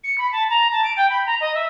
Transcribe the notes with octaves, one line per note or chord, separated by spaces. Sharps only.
C#7
B5
A5
A#5
A5
D7
G5
B5
A#5
D#5
E5